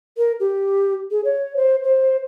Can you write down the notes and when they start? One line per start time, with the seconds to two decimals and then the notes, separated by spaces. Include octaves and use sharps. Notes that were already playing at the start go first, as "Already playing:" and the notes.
0.17 A#4
0.40 G4
1.11 G#4
1.25 C#5
1.56 C5
1.84 C5